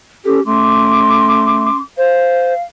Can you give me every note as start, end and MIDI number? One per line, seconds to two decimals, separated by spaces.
0.25 0.40 61
0.25 0.42 67
0.25 0.40 69
0.46 1.69 57
0.46 1.78 61
0.46 1.78 84
0.46 1.78 86
1.98 2.53 72
1.98 2.64 77